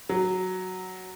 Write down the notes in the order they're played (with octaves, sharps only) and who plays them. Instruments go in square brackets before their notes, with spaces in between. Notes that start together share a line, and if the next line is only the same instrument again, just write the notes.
[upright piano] F#3